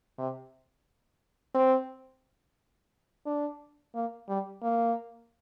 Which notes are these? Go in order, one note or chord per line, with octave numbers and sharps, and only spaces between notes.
C3
C4
D4
A#3
G3
A#3